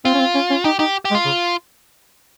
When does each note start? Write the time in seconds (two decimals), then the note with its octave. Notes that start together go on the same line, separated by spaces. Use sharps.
0.05 C4 F4
0.14 C#4
0.19 C4
0.35 C#4
0.50 C#4
0.64 D#4 G4
0.79 D#4 G4
1.05 G4
1.11 G#3
1.15 F4
1.25 C#3